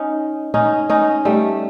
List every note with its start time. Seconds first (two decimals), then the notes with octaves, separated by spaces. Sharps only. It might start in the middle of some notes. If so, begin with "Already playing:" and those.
Already playing: C#4 D#4
0.54 C#4 D#4
0.90 C#4 D#4
1.25 G3 A3